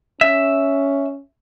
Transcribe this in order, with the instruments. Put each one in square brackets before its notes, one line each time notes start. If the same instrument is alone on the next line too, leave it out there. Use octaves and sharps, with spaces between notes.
[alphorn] C#4 [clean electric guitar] E5